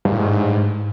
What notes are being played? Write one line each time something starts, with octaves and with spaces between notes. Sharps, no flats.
G2
A2
G#2